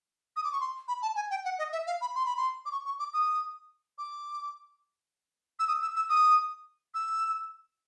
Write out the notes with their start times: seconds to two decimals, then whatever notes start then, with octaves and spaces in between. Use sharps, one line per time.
0.36 D#6
0.44 D6
0.52 C#6
0.60 C6
0.88 B5
1.02 A5
1.16 G#5
1.30 G5
1.45 F#5
1.58 D#5
1.72 E5
1.87 F5
2.01 B5
2.15 C6
2.25 B5
2.37 C6
2.65 D6
2.72 C#6
2.85 C#6
2.99 D6
3.13 D#6
3.98 D6
5.59 E6
5.68 D#6
5.82 E6
5.96 E6
6.09 D#6
6.94 E6